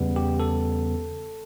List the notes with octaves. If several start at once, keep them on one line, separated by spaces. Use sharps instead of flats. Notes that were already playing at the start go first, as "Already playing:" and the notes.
Already playing: E2 C#3 G3 B3
G4
A4